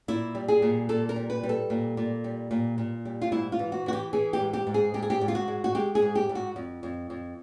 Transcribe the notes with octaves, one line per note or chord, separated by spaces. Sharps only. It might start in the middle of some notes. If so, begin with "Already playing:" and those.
A#2 E4
G3
G#4
A#2
A#2 A4
A#4
G3
B4
G3
A4
A#2
A#2
G3
A#2
A#2
G3
F4
G#2 E4
F4
E3
F#4
E3 F#4
G4
E3 G#4
G4
G#2
G4
G#2
G#4
G#2 G4
G#4
G4
G#2
F4
F#4
G#3
F#4
G#3 G4
G#4
G#2
G4
G#2
F#4
F2
F2
F2